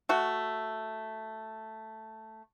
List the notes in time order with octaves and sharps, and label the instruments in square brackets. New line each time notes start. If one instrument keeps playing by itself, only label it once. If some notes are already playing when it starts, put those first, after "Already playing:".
[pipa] A3 F#4